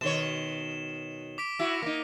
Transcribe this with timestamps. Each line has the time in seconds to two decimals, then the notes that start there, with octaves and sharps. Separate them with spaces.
0.01 B2 D#3 C#5 E7 G7
1.38 D6 B6 D7
1.59 E4 F#4 A#6
1.83 A#3 D#4